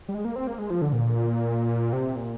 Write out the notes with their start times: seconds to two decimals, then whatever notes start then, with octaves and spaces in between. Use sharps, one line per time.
0.09 G3
0.14 G#3
0.25 A#3
0.36 C4
0.47 A#3
0.58 G#3
0.70 F3
0.82 D3
0.93 A#2
1.93 C3
2.16 A#2